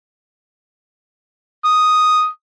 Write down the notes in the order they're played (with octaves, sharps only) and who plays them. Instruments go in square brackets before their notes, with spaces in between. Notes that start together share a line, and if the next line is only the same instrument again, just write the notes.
[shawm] D#6